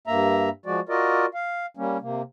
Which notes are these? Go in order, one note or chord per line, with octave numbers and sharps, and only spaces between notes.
G2 A#3 E5 A#5
F3 G#3 F#4 D5
F4 F#4 A#4 D5 D#5
F5
G3 A#3 C#4
C3 A#3